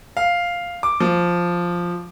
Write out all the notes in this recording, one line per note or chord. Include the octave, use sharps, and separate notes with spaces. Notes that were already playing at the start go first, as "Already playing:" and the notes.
F5
D6
F3